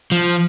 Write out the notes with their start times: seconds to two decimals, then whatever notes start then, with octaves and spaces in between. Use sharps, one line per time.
0.12 F3